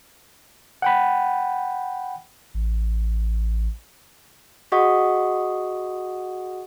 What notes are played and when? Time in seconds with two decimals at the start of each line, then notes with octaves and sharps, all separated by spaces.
0.82 F#5 G5 B5
2.54 A1
4.72 F#4 G#4 D#5 F#5 C#6 D#6